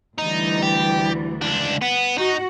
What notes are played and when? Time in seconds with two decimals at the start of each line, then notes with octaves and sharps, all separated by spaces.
0.18 D2 E3 G3 D#4
0.62 G4
1.42 C#2 D4
1.82 B3
2.18 D#4 F#4